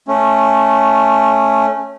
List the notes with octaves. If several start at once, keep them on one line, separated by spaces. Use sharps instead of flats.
A3 C#4